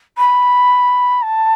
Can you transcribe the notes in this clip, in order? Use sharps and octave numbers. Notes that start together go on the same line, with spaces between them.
B5
A5